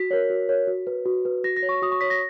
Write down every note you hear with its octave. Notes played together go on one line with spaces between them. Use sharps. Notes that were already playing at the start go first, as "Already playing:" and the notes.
Already playing: F#4 B6
A#4 C#5
F#4
A#4 C#5
F#4
B4
F#4
B4
F#4 A#6
A#6
C#5
C#6
F#4 D#6
C#6
C#5 B6
A#6